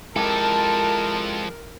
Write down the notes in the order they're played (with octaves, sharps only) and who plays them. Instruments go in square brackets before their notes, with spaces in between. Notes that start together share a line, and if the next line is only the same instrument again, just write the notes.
[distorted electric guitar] F3 A4 [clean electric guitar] G#3 E4 G4 [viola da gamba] A#4 [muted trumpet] A5